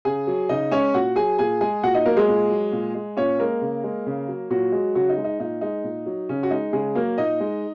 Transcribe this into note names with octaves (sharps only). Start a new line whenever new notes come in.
C#3 G#4 G#5
F#3
C#3 D#4 D#5
G#3 C#4 C#5
A#2 F#4 F#5
F#3 G#4 G#5
A#2 G#4 G#5
G#3 G#4 G#5
A#2 F#4 F#5
D#4 D#5
F#3 A#3 A#4
G#3 G#4
A#2
F#3
A#2
G#3
A#2 C#4 C#5
G#3 A#3 A#4
C#3
G#3
C#3
F#3
A#2 F#3 F#4
G#3
C#3 F#3 F#4
D#4
G#3
D#4
A#2 D#4
G#3 D#4
A#2
F#3
C#3 C#4
F#4
G#3 D#4
C#3 G#3 G#4
F#3 A#3 A#4
A#2 D#4 D#5
G#3